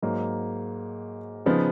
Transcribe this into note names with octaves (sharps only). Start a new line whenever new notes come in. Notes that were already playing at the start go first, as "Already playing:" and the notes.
G#2 F#3 A#3
C#3 F3 B3 D#4